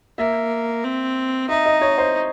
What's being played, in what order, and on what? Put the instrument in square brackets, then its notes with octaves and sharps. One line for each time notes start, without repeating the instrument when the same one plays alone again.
[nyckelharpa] A#3 [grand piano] E5
[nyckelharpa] C4
[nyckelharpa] D#4 [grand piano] E5
[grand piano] D#5
C#5
C5